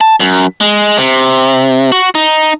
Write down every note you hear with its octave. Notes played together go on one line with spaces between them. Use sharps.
A5
F#2
G#3
C3
F#4
D#4